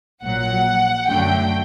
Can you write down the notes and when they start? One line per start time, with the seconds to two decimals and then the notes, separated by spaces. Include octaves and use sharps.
0.23 A#1 A#2 F#3 F#5
1.07 F#2 D3 F#3 A3 G5